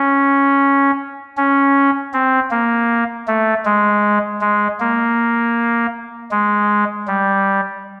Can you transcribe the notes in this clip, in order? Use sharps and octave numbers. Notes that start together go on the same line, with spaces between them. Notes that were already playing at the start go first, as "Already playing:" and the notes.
Already playing: C#4
C#4
C4
A#3
A3
G#3
G#3
A#3
G#3
G3